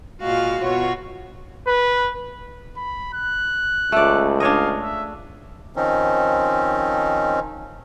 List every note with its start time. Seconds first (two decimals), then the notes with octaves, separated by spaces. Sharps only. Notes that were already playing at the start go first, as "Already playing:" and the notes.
0.21 A#2 G#3 F4 F#4 F5
0.62 B2 F4 F#4 C#5
1.67 B4
2.77 B5
3.14 F#6
3.92 C#2 A3 D5
4.40 D4 C#5 D#5 F5
4.82 E5
5.76 D#3 F3 C4 C#4 D#4